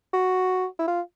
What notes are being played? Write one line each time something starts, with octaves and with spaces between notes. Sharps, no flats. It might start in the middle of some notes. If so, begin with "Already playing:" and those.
F#4
E4
F4